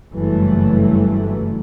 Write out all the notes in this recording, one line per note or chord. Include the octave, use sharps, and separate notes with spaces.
F#1 G2 E3 F#3 G3 A3